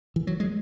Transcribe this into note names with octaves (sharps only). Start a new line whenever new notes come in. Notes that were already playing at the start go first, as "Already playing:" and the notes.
E3
F#3
G#3